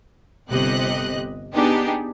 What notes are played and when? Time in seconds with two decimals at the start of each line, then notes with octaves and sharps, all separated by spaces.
0.49 G1 C3 G4 D#5 F#6
1.54 B3 D4 D#4 G4 G#4